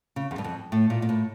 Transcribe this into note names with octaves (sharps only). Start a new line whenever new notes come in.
C#3
E2
G2
F2
A2
A#2
A#2
A2